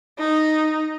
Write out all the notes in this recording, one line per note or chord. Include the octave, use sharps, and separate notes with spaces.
D#4